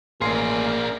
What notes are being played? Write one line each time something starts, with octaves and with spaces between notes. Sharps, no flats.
A1 A#3 D4 G#4 A#4 C6 C7